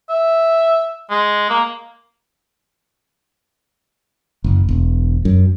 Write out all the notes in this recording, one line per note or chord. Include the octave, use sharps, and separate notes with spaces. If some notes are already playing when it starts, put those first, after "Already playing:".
E5
G#3
A#3
F#1
E1
F#2